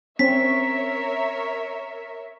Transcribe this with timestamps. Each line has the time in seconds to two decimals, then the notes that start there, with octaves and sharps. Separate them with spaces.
0.19 C4 C#4 A#4 C#5 E5 B6